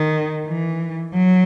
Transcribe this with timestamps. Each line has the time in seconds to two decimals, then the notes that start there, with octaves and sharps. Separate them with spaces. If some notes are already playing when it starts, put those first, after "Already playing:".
Already playing: D#3
0.47 E3
1.14 F#3